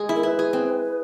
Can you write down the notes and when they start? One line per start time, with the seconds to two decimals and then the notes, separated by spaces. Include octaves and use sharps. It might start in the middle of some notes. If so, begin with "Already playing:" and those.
Already playing: G#3 G#4
0.09 E4
0.15 A#4
0.23 E4 B4
0.39 G#4
0.53 C4